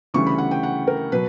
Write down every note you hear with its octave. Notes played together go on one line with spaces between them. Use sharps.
D2 C#3 E3 G3 C#6
B5
F#5
G5
F#5
A#4
B2 F#3 B4